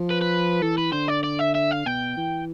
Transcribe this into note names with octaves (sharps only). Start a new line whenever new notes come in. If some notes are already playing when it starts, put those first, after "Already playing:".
Already playing: F3
B4
B4
E3 A4
B4
D3 C5
D5
D5
E5
E5
F5
B2 G5
E3